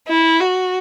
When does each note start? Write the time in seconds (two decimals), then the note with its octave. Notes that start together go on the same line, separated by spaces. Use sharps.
0.08 E4
0.40 F#4